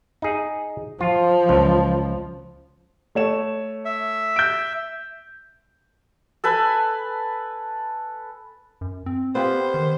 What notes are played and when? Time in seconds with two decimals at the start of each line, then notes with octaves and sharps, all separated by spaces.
0.22 D#4 G#4
1.01 F3 F4
1.49 C#2
3.15 A3 C#5 E7
3.85 E5
4.36 G6 D7
6.44 A4 B4 G#5 B5
8.81 F#2
9.06 C4
9.35 B3 F4 G4 C5
9.74 D#3